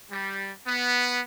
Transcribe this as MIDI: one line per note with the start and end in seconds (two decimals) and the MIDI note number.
0.11 0.50 55
0.66 1.20 59